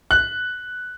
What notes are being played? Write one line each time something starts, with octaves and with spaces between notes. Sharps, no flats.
F#6